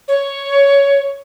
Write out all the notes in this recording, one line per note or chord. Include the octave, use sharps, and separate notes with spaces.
C#5